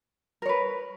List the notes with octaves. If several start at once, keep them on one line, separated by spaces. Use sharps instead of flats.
A#4 B4 C#5